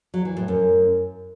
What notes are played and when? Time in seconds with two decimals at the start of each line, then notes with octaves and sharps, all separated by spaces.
0.14 F#3
0.25 E3
0.37 A2
0.48 F#2